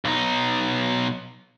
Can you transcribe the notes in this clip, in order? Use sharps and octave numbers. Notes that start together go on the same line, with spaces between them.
B1 D#4